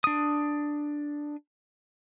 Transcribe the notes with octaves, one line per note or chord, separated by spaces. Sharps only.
D4 D#6